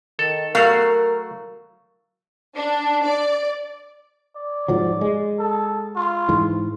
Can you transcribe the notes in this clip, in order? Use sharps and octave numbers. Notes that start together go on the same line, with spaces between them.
D#3 A4
F#3 A3 F#4 A#4 F5
D4
D5
D5
G#2 F3 F#3
G#3
A4
F4
G#2 E3